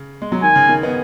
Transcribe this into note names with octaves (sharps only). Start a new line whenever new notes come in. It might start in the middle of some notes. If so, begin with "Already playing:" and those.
Already playing: C#3
G#3
F#3
D#3 G#5
C#3
D#3
B3 D#4